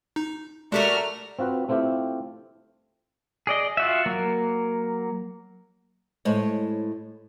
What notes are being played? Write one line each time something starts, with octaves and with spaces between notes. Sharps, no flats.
D#4
G#3 A3 D4 F#4 G4 A#4 F6 B6
C4 F4 F#4 B4
A3 C4 E4 F4 G4
G#4 D5 D#5
F4 F#4 E5
F#3 A#3
A2 G#3 C5 C#5